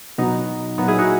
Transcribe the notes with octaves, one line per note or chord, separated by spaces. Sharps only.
B2 F#3 B3 D#4
A#2 F#3 B3 D#4
E4 G#4
D#4 F#4